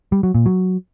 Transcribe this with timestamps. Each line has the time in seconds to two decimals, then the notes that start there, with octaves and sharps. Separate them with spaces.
0.12 G3
0.23 F#3
0.35 A#2
0.46 F#3